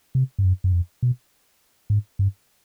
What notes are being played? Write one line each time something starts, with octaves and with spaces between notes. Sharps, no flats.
C3
G2
F#2
F#2
F2
B2
G#2
G2